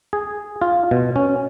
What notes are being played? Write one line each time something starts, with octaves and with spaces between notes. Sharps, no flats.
G#4
F4
B2
C#4